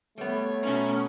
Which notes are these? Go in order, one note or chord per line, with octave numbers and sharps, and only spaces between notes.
G3 A3 B3 C#5
B2 C#4 A#5